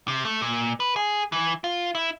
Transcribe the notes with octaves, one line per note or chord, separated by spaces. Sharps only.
C3
A3
A#2
B4
G#4
E3
F4
E4